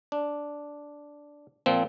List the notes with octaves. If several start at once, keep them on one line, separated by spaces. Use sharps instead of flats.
D4
A#2 F3 C4